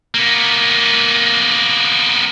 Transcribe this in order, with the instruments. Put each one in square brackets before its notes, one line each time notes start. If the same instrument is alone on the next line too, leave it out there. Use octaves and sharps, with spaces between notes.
[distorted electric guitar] A#3 B3